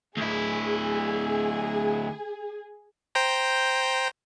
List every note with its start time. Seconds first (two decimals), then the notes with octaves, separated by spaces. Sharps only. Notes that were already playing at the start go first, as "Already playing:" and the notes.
0.17 D2 E4 G#4
3.15 C5 G5 A#5